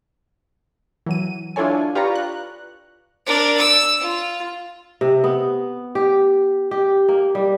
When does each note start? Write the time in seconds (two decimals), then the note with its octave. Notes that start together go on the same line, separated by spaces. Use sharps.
1.06 E3 F#3 D#7
1.56 D4 E4 F4 A4 C#5 G#5
1.95 F4 G4 B4 D5 A#5 C#6
2.15 F#6
3.26 D4 A#4
3.57 E6
4.00 F4
5.01 C3
5.24 B3
5.95 G4
6.71 G4
7.08 A#3
7.35 G3